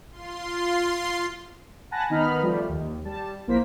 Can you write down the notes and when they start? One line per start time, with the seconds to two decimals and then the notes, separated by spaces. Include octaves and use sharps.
0.11 F4 C6
1.91 F#5 G#5 A5 B5 F#6 A#6
2.10 D#3 B3 D#4 B5 F6
2.42 F3 G3 A3
2.69 D#2
3.05 G3 A5
3.47 A#1 A#3 E4 C5 B6